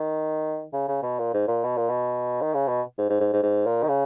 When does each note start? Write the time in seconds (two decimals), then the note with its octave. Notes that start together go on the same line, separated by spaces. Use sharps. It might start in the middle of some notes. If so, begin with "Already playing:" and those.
Already playing: D#3
0.73 C#3
0.88 C#3
1.03 B2
1.19 A#2
1.34 G#2
1.48 A#2
1.64 B2
1.77 A#2
1.89 B2
2.41 D#3
2.54 C#3
2.68 B2
2.98 G#2
3.09 G#2
3.21 G#2
3.33 G#2
3.43 G#2
3.66 A#2
3.83 D#3
3.88 C#3